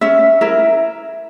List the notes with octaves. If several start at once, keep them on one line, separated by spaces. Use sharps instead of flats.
C#4 E5
E4 A#4 E5